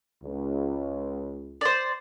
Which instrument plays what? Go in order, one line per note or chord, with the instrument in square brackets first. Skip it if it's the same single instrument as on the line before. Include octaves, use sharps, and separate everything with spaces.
[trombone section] C#2
[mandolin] C5 D5